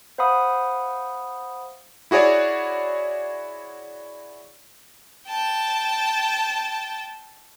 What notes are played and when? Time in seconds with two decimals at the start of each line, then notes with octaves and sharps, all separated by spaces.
0.18 C5 F5 F#5 B5 D#6
2.11 E4 F#4 G#4 C#5 D5
5.28 G5 A5